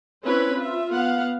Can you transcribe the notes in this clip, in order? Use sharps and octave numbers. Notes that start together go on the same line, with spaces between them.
C4 C#4 E4 B4 C#5
F4 E5
B3 F5 F#5